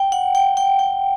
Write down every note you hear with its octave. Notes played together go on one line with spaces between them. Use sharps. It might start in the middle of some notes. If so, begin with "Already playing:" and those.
Already playing: G5
F#5
G5
G5
G5